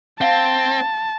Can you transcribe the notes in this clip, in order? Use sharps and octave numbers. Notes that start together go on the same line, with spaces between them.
C4 F5 F#5 A5